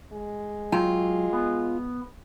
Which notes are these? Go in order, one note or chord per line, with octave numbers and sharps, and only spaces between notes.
G#3
F#3 F4 G5
B3